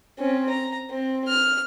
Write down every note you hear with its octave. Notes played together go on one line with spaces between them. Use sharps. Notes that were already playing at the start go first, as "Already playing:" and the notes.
C4 C#4
A#5
C4
F6